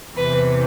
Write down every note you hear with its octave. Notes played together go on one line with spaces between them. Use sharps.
E2 C3 E3 B4